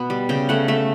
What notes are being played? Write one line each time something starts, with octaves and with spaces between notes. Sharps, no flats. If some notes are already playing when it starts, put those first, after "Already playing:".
Already playing: B2 B3
G3
C#3 G5
A3 F#5
A3 E5